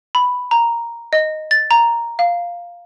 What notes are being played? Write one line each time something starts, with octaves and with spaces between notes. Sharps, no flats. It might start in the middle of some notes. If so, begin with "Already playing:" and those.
B5
A#5
D#5
A6
A#5
F5